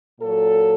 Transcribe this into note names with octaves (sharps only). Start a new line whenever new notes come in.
A#2 F#3 A4